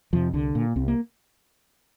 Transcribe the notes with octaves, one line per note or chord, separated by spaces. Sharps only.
F2 C3 F3
C2 D3
A#2
C2 C4
A#3